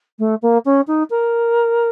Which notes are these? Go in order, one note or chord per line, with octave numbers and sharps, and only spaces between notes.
A3
A#3
C#4
D#4
A#4